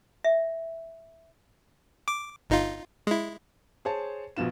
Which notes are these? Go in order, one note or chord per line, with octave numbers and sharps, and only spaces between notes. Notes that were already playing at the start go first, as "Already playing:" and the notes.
E5
D6
G1 D#4 F4
G#3 E4
G#4 C5 C#5 A5
A#1 B2 B3 F4 E7